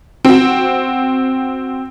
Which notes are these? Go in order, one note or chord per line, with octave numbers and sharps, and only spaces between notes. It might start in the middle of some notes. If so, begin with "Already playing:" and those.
C4 F#4